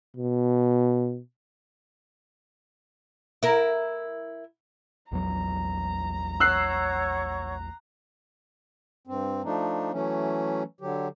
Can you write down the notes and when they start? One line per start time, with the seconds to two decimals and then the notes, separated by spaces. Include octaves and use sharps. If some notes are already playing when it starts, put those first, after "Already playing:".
0.17 B2
3.43 E4 A#4
5.12 A#1 E2 F#3 A#5
6.40 C#5 F#5 C#6 E6 F#6 C7
9.07 G2 C4
9.44 F3 A3 D4 D#4
9.92 E3 F#3 A3 C#4
10.81 D3 F#3 G4